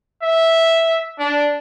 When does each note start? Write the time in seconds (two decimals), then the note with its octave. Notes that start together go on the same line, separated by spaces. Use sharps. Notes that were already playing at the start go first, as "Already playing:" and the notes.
0.22 E5
1.19 D4